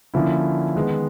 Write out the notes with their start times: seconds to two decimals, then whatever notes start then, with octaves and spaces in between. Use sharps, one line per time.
0.14 D3 F3 A#3 C#4 E4
0.75 D#3 G#3 B3